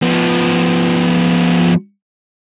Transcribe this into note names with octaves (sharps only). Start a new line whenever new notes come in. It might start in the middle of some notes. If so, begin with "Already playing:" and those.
F3 B3